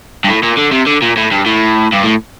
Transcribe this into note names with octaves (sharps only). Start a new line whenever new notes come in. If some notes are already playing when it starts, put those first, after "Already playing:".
G2
A2
A#2
D3
C3
D3
A#2
A2
G2
A2
G2
A2